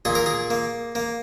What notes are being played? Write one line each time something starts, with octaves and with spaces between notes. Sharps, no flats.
A#2 G#4
A#4
G#4
A#3
A#3